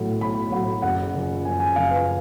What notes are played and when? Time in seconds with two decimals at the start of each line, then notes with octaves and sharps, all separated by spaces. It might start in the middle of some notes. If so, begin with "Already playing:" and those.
Already playing: B1 A2 F#3
0.21 B1 B5
0.51 A2 F#3
0.82 F#1 F#5
1.14 F#2 C#3 F3
1.45 F#1 G#5
1.60 G#5
1.76 F#2 C#3 F3 F5
1.91 B4